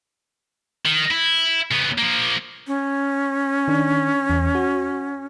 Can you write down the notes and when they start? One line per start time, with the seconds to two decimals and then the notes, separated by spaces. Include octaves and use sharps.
0.85 D#3
1.10 E4
1.71 C#3 B3
1.98 F3 A#3
2.67 C#4
3.68 D#3 D4
4.30 E2
4.55 F#4